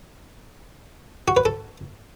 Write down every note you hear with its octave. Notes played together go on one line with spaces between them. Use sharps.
F#4
B4
A4